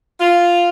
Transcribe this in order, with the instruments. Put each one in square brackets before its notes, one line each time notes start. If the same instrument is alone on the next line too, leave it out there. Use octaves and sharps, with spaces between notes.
[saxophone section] F4